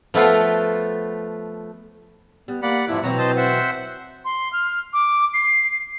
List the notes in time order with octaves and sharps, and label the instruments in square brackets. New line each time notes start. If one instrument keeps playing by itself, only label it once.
[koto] F3 A3 B3 F4
[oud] G3 [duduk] B3
[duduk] A#3 [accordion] D5 F#5 B5
[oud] E2 G#2 [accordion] C3 F3 [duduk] E4
[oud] B2 E3 F#3 [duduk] C4 [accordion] A#5
[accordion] C5 D#5 A5
C5 E5 F#5
[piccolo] C6
F6
D6
C7